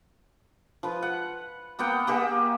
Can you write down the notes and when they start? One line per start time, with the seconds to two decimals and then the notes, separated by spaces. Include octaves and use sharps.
0.83 F3 B4
1.02 F#5
1.79 A#3 B3 F#5 G5
2.07 A#3 G4 G#4 E5